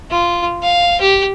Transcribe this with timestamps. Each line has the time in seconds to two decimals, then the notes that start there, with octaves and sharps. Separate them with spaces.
0.11 F4
0.63 F5
1.01 G4